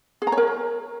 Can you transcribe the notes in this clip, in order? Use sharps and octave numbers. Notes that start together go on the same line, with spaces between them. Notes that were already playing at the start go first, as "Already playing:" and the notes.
G#4
A#5
C#5
A#4